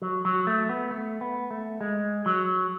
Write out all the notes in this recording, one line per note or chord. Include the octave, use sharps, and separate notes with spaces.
F#3
F#3
A3
B3
A3
B3
A3
G#3
F#3